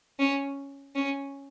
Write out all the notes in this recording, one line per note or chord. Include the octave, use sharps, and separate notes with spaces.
C#4
C#4